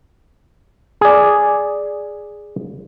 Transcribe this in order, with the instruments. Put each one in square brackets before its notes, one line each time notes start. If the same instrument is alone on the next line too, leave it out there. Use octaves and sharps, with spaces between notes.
[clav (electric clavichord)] G#4 D5